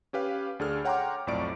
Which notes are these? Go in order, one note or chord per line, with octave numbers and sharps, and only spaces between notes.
C#4 G4 B4 F5
D2 D4 G#4 A4 F6
C#5 F#5 G5 A#5 C6 D6
B1 F2 A2 D5 C#6 D7